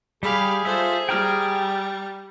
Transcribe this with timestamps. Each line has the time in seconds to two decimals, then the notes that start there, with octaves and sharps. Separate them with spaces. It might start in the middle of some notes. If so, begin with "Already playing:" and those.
0.23 G3 G4 G#4 F5 B5
0.65 F4 A4 C5 E5
1.09 G3 G5 A#5 F6